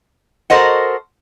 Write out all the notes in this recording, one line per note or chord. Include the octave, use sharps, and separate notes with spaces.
F#4 A4 A#4 C5 D#5 F#5